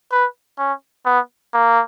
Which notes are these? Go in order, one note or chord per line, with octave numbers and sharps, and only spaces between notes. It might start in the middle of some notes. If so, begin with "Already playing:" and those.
B4
C#4
B3
A#3